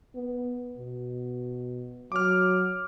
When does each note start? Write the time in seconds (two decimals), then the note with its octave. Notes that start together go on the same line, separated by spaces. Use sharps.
0.15 B3
0.78 B2
2.12 F#3 D6 F6